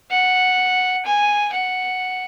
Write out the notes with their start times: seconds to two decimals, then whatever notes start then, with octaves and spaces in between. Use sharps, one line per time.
0.10 F#5
1.05 G#5
1.52 F#5